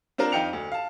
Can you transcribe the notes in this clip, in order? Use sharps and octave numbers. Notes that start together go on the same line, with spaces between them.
C4 D4 F4 A#4
F2 D#4 F5 G5 C#7 F7
D2
F5 A5